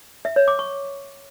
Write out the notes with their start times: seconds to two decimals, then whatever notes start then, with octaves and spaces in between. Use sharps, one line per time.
0.25 E5
0.36 C#5
0.48 D6
0.59 C#6